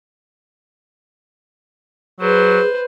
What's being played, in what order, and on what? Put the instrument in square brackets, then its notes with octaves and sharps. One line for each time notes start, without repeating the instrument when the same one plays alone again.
[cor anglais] F#3 [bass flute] G#4 [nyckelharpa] B4 C5